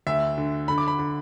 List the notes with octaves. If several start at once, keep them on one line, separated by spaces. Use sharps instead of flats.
D2 E5
D3
D3 B5
D6
B5
D3